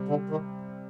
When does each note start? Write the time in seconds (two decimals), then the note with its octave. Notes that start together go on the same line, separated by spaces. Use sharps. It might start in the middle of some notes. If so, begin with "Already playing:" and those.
Already playing: C3 G3 C4
0.08 D3
0.30 D#3